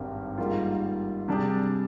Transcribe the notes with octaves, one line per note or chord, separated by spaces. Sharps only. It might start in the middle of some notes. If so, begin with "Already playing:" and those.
Already playing: G#1 G2 D#3 G3 C4
G#2 D#3 G3 A#3 F4
C3 G3 D4 G#4